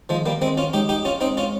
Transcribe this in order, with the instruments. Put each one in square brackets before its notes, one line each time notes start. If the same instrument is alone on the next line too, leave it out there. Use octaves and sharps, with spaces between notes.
[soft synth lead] D#3 [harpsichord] F3 G#3
[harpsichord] G3 A#3
[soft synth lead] D#3 [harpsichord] G#3 C4
[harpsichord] C#4 F4
[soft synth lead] G#3 [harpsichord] D#4 G4
[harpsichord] D#4 G4
C#4 F4
C4 D#4
C#4 F4